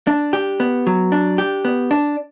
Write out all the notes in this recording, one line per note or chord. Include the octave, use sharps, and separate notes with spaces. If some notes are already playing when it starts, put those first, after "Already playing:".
D4
G4
B3
F#3
D4
G4
B3
D4